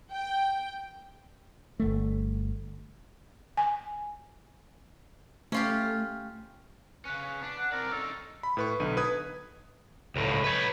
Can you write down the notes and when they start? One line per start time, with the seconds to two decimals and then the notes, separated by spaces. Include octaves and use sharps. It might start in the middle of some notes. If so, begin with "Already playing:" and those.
0.12 G5
1.80 G1 A3
3.57 G#5
5.52 A3 C#4 F4 G4
7.05 C#3 C#4 B4
7.42 D4
7.58 F#5
7.72 C4 A#4 D5
7.91 C#4 D#4 A4
8.43 B5
8.57 A2 B4 C#6
8.80 B1 D3 D#7
8.96 D#4 B4 D#6 G#6
10.16 C#2 A2
10.44 B4 C#5